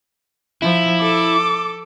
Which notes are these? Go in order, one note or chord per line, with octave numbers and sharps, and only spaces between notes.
F3 E4
A4 D6